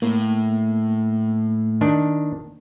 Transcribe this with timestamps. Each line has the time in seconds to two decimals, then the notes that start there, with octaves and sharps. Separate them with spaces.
0.02 A2 A#3
1.81 D#3 D4